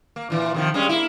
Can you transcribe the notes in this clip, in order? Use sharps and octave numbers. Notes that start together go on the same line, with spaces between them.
A#3
A#2 E3
C3 D#3 F3
G3 G#3 C#4
A#3 E4